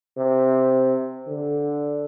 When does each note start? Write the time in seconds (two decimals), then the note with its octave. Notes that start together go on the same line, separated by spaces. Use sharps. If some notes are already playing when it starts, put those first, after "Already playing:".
0.18 C3
1.28 D3